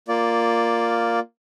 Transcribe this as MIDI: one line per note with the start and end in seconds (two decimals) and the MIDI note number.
0.08 1.19 58
0.08 1.19 65
0.08 1.19 74